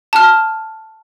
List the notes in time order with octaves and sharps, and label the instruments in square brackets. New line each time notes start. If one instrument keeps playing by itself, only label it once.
[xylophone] A5 F6